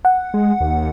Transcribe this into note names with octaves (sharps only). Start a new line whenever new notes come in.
F#5
G#3
D#2